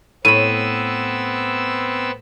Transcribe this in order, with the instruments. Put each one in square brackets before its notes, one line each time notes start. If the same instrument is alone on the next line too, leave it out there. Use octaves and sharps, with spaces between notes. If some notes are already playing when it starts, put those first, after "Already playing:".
[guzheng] A2 B5 [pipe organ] B3 C4 E6 [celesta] D#7